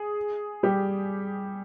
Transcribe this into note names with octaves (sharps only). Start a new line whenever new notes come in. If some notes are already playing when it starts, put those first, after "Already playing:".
Already playing: G#4
G3 G4